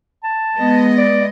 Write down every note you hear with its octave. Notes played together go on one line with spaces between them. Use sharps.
A5
G#3 B3 D#5
D5